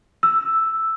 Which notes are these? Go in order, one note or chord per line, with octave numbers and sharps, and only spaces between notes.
E6